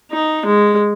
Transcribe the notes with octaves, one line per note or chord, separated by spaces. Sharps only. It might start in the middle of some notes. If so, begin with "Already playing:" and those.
D#4
G#3